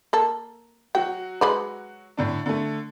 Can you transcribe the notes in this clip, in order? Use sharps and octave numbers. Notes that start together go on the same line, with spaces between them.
A#3 A4
F#3 F#4 G5
G#3 B4 D5
A2 D3 D4
D3 A3